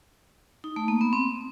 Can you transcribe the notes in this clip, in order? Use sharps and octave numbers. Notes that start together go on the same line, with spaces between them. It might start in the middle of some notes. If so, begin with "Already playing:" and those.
D#4
A3
A#3
B3
C4